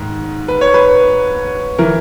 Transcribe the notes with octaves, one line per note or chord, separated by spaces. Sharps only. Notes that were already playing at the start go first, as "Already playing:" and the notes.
Already playing: G#2 D#3
B4
C#5
B4
E3 A#4